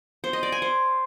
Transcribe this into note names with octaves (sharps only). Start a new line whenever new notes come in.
C5
D#5
D5
G#5
C5